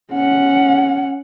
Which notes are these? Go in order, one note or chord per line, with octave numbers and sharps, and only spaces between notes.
C#4 F#5